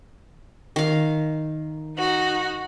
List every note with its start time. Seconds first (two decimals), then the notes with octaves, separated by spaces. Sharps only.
0.76 D#3 F5
1.98 D#4 F#4